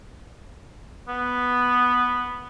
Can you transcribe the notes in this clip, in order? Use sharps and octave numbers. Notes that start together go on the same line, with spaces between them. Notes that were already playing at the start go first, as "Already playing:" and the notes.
B3